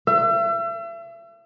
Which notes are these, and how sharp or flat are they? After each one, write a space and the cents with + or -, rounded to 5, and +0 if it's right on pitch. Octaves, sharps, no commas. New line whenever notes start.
E5 +40